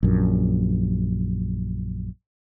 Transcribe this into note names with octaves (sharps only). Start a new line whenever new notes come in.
A#1 F#2